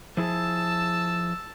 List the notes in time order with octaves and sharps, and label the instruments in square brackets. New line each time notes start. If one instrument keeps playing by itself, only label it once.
[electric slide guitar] F3 E4 G#4 [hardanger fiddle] A5 [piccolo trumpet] E6